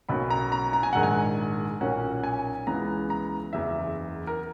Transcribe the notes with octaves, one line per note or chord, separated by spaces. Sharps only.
B1 B2 A#3 C#4 B5
A#5
A#5
A#5
G#5
A#1 G#2 D#3 G#3 F#5
G#5
B1 A#2 A#3 C#4 F#5
G#5
C#2 C#3 E3 G#3 B3 A#5
A#5
F#1 E2 C#3 E5
A#4